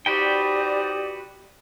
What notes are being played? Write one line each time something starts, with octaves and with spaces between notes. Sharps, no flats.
D#4 F#4 G4 B4 C5 D5 G5